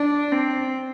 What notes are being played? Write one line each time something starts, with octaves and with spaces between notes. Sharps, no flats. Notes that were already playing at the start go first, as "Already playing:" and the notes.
Already playing: D4
C4